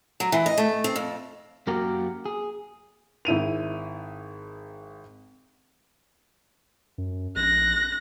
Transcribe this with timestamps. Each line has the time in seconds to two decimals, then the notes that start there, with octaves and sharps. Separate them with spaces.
0.20 F#3
0.32 E3
0.46 D#5
0.58 A3
0.84 C4
0.96 F2
1.67 F#2 A#3 F#4 G4 A#4
2.26 G#4
3.25 G#1 E4 D#7 F7
6.98 F#2
7.36 A#1 F#6 A#6